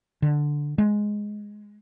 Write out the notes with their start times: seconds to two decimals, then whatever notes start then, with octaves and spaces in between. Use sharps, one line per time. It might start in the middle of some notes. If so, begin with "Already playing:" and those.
0.22 D3
0.78 G#3